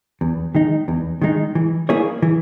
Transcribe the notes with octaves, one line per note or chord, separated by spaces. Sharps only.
E2
D#3 G#3 D#4
E2
D#3 G#3 D#4
E3
A#3 E4 G#4 C#5
E3